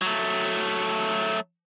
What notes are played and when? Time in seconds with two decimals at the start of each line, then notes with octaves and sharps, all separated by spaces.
0.02 F#3 A3